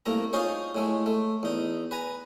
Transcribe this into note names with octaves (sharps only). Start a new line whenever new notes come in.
C2 A3 A#3 A#5
D#4 F4 G#4 C5 C#5
A2 G#3 A3
A3
E2 D#4
B4 G#5 A#5